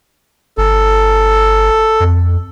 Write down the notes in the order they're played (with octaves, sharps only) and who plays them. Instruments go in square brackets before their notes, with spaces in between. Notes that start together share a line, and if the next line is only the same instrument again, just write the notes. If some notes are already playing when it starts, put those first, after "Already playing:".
[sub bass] G1 [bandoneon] A4
[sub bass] F2